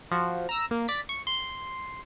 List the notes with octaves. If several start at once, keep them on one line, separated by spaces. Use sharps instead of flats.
F3 F#4
A#5 E6
A#3
D5 B6
C#6
C6